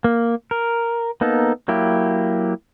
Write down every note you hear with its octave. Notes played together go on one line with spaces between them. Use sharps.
A#3
A#4
A#3 B3 D#4 A4
F#3 A#3 E4 G4